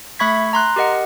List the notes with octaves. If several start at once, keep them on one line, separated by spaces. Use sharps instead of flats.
A3 E5 B5 C#6 G#6 B6
A#5 C6 F#6
G4 A#4 D#5 F#5